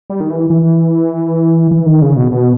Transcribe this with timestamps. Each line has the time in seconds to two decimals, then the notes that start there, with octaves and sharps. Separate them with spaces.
0.10 G3
0.20 D#3
0.30 E3
0.50 E3
1.71 E3
1.86 D#3
2.02 C#3
2.17 B2
2.32 B2